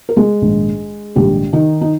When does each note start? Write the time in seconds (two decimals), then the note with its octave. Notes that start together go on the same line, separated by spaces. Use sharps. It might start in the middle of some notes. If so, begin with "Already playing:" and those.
0.09 A#4
0.16 G#3 G#4
0.41 A#1 G#2 D#3
1.16 A#1 G#2 D#3 G3 G4
1.53 D#3 D#4
1.81 D#4